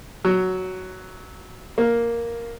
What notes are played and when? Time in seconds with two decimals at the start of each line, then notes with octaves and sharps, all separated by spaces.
0.25 F#3
1.78 A#3